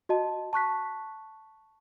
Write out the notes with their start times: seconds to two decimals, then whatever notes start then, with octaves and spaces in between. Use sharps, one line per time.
0.09 F#4 D#5 A5
0.53 A5 C#6 F#6 B6